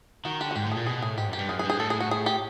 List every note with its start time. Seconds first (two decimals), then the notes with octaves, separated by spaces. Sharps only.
0.25 D#3 F#4
0.40 D3 G4
0.51 F#4
0.56 G#2 G4
0.66 A2
0.72 G#4
0.77 A#2
0.86 B2 G#4
1.02 A2 G#4
1.18 G#2 G4
1.28 F#2 G4
1.39 G2
1.49 F#2 G#4
1.59 G#4
1.64 G2
1.70 G#4
1.80 A2 A4
1.90 G#4
2.00 F#4
2.11 G#4
2.26 G4